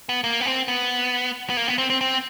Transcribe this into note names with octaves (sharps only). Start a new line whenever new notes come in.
B3
A#3
B3
C4
B3
B3
A#3
B3
C4
C4
C4